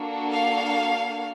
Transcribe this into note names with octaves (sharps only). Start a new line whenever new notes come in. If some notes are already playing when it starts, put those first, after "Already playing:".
Already playing: A#3 D4 F#4 A4
F5